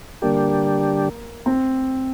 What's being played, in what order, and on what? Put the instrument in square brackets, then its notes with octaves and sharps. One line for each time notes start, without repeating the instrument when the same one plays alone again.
[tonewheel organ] D3 G3 D4 G4 [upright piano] A#3
[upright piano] C4